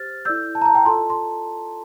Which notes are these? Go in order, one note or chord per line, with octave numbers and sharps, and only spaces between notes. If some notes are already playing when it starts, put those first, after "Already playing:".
Already playing: G4 C5 F6 A6
E4 A4 D5 E6 G6
A5
A#5
A5
G5 A#5
F4 A4 D5 A5 C6
C6